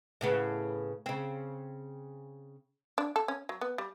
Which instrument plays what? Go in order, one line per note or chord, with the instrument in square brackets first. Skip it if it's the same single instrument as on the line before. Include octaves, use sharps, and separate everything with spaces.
[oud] A2 C#3 B3
C#3 C4
[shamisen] D4
A4
C#4
F#3
B3
G3